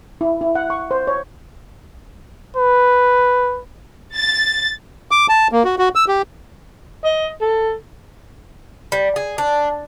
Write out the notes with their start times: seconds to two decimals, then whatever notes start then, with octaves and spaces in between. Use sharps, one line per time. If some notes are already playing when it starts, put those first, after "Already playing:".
0.21 E4
0.41 E4
0.55 F#5
0.70 C#6
0.91 C5
1.07 C#5
2.57 B4
4.16 A6
5.11 D6
5.29 A5
5.52 A#3
5.65 F#4
5.78 F#4
5.95 E6
6.08 G4
7.04 D#5
7.41 A4
8.92 G3
9.16 G#4
9.38 D4